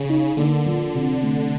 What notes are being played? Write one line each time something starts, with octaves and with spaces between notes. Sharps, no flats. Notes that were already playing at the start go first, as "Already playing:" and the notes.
Already playing: C#3
D#4
D3 A#3
F3
C3
A3